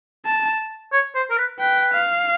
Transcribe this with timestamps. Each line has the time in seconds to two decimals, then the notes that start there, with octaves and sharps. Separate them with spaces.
0.26 A5
0.92 C#5
1.15 C5
1.30 A#4
1.38 B4
1.59 B4 G5
1.93 F5